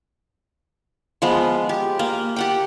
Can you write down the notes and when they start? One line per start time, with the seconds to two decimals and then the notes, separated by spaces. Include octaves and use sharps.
1.22 F3 G#3 B3
1.69 G4
1.99 A#3
2.36 G4 F#5 G5